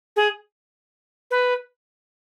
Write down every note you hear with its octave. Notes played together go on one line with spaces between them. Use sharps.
G#4
B4